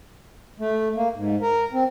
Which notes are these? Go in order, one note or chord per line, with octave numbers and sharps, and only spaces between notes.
A3
A#3
G#2
A#4
C4